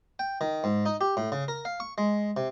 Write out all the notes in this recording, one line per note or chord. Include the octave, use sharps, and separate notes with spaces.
G5
D#3
G#2
D#4
G4
A2
C#3
A#4
F5
C#6
G#3
C3